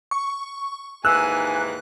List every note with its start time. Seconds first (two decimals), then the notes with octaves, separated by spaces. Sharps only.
0.11 C#6
1.05 D#2 G#2 E3 G#5 E6 F#6